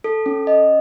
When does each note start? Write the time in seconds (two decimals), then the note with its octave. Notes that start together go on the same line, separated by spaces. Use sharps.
0.04 A4
0.26 C#4
0.47 D#5